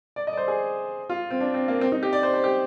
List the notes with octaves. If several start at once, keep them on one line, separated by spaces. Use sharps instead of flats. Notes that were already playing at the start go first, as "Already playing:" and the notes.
D5
D#5
D5
C5
G#4
F4
C4
D4
C4
A#3
C4
D#4
G4
D5
C5
C5
G4